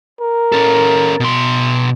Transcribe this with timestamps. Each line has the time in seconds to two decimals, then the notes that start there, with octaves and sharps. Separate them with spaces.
0.21 A#4
0.52 C#4 A4
1.20 B2 C6